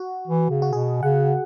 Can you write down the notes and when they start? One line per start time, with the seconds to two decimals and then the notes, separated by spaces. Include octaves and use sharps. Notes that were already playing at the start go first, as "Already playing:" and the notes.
Already playing: F#4
0.28 E3
0.50 C#3
0.62 F#4
0.73 B2 G#4
1.03 C#3 F#5